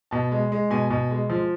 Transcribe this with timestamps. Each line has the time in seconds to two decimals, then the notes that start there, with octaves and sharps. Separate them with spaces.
0.11 B2 A5
0.32 G#3
0.52 G#3
0.70 B2 G#5
0.90 B2
1.11 G#3
1.30 F3